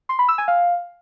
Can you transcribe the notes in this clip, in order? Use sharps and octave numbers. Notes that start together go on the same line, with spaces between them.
C6
B5
E6
G#5
F5